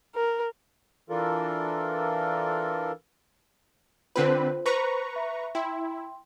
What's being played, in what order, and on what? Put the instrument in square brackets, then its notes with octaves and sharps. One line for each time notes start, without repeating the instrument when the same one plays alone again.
[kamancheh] A#4
[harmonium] E3 D4 F4 A4 A#4
[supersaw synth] D3 C4 B4 [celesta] F4 C5
[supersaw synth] B4 A#5 C#6 [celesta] C5
[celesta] E5
[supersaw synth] E4 [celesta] G5 C6